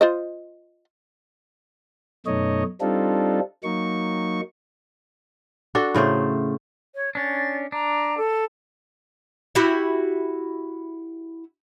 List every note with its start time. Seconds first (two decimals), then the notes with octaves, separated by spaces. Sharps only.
0.01 F4 C5 D#5
2.26 F#2 B2 A3 D#4 C#5 D#5
2.81 G3 C4 D4 D#4 F4 A4
3.64 F#3 A#3 D#4 C#6
5.75 D4 F#4 A4
5.94 A2 C#3 A3 C5
6.95 C#5
7.15 C#4 D4 A6
7.72 D4 A#5
8.17 A4
9.55 E4 F#4 G4